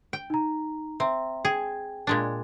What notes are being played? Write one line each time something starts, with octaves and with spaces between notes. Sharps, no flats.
G5
D#4 A#5
C4 E5 A#5
G#4 G5
A#2 G#3 D4